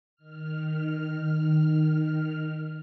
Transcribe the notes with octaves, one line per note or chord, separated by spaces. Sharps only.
D#3 F6